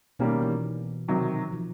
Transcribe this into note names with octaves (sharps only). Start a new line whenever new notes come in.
B2 D#3 G3 A#3 C#4
E3
C3 D#3 F#3
F3